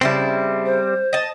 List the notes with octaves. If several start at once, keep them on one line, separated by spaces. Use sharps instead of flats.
C#3 G3 C4 E4 A5
C5
D#5 A5